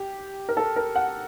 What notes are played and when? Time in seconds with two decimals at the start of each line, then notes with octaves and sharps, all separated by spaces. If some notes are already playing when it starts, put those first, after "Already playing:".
Already playing: G4
0.49 A#4
0.57 A4
0.76 A#4
0.96 F#5